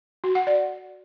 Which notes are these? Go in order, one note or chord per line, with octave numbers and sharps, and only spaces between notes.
F#4
F#5
D5